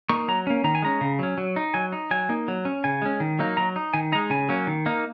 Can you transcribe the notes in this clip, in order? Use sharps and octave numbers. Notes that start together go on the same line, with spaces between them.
A#3 D#4 C#6
F#3 A#5
A#3 C#4
D#3 A#5
G#5
G#3 C#4 A#5
C#3
F#3 C#4
F#3
D#4
F#3 G#5
D#4
F#3 G#5
A#3 D#4
F#3
C#4
C#3 G#5
G#3 C#4
D#3
F#3 A#3 D#4
F#3 A#5
D#4
D#3 G#5
G#3 D#4 A#5
C#3 G#5
F#3 A#3 C#4
D#3
A#3 D#4